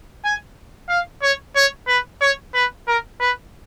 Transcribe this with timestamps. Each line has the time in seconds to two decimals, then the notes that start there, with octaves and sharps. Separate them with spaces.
0.25 G#5
0.89 F5
1.22 C#5
1.56 C#5
1.88 B4
2.21 C#5
2.54 B4
2.88 A#4
3.21 B4